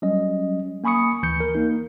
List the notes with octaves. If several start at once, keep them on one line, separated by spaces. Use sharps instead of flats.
F#3 G3 C#4 D#5
A#3 G#5 B5 C#6 D#6 C#7
D2 E3 G6 C#7
A#4
A#3 D#4